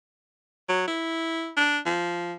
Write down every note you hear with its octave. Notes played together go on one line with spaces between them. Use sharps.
F#3
E4
D4
F3